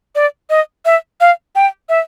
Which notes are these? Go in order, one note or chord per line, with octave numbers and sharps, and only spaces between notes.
D5
D#5
E5
F5
G5
E5